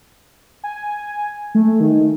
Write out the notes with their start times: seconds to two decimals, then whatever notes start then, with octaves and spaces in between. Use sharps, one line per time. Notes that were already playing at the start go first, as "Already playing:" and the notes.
0.64 G#5
1.55 A3
1.80 D#3